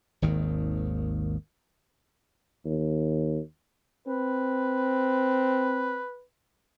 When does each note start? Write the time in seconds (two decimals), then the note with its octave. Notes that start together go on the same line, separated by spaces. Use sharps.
0.22 G#1 D#2 D#3
2.65 D#2
4.08 C4 B4